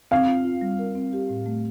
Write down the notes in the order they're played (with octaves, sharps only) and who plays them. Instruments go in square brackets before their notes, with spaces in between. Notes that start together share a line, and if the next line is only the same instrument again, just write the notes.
[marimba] C4 [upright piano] F5
[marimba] F4
F4
G3
A#4
C4
G4
A2
A3